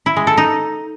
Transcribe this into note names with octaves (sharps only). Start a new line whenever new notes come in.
E4
G#3
A4
D#4